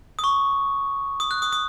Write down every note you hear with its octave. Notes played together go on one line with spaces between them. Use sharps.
D#6
C#6
D#6
F#6
D#6
D#6